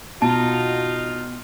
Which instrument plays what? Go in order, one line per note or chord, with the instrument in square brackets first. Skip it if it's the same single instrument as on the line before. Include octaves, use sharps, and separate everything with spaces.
[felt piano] B2 [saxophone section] D#4 F4 [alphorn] F#4 [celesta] A5